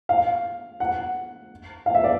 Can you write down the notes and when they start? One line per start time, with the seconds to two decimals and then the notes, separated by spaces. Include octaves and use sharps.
0.09 F5
0.80 F#5
1.86 F5
1.95 E5
2.04 D5